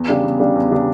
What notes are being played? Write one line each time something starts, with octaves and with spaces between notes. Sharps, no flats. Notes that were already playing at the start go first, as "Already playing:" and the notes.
Already playing: E2
C#3 G3 D4
E2
C#3 G3 D4
E2
C#3 G3 D4